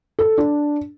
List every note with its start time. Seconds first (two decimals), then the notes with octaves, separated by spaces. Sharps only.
0.19 A4
0.38 D4